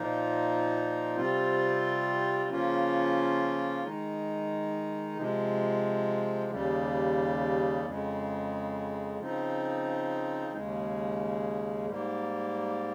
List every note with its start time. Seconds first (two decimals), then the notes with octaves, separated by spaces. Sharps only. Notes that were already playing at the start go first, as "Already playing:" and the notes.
Already playing: A#2 F3 A#3 D#4
1.16 C3 G3 C4 F4
2.50 C#3 F3 A#3 C#4 F4
3.84 D#3 G#3 D#4
5.17 C3 F3 G#3
6.52 D#2 C#3 G3
7.85 F2 C#3 G#3
9.19 C#3 F3 C4 D#4
10.53 D#2 C#3 G#3
11.87 G#2 G3 A#3